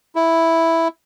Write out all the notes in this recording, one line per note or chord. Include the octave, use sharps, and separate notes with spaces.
E4